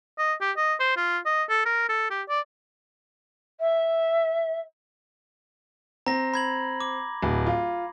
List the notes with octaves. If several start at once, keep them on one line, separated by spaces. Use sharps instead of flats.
D#5
G4
D#5
C5
F4
D#5
A4
A#4
A4
G4
D5
E5
C4 A#5 A#6
B5 G#6 F#7
D6
D1
F4